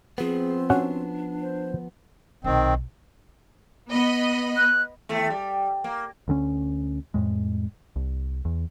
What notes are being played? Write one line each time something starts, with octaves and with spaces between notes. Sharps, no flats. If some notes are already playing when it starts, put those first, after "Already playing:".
F3 B3 C4 G#4
C#4 D4 F#4 F#5
C5
B1 A#2 D#3 C4
B3 D#5 B5
F#6
D#2 A3
G3
A#3
D2 D3 C4 C#4
F2 A2 G#3
C2
E2